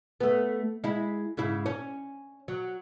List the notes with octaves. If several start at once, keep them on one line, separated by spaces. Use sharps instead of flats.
A3 B3
G#3 E4
G#2 C#3 E4
C#4
F#3